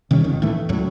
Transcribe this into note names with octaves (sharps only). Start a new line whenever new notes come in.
C3 D#3 G3 C#4
G1 C#2 D#3
A2 E3 A3
C#2 F#2 A2 F#3